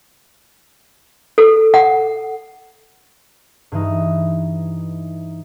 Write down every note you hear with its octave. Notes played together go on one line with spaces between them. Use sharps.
A4
F#5
G2 E3 D#4